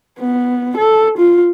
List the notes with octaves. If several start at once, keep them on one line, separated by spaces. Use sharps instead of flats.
B3
A4
F4